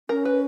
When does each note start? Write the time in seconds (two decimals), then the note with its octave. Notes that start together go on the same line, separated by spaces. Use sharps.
0.09 C#4 A#4
0.25 B4